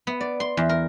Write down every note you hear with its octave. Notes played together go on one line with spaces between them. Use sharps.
B3
D5
C6
E2
A#4